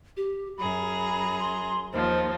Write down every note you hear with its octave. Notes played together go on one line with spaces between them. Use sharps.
G4
F#2 G#4 A#5 B5
C6
D#2 F3 C5